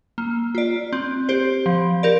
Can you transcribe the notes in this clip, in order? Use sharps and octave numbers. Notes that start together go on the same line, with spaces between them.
A#3
F4 D5
C4
G4 C5
F3
G4 A#4 D5